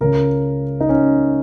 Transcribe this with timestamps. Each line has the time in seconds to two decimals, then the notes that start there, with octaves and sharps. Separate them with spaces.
0.01 C#2 C#3 A#4
0.81 D#4
0.89 C#4